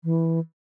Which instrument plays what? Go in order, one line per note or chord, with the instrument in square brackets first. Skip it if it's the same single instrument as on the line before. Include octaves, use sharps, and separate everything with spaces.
[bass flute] E3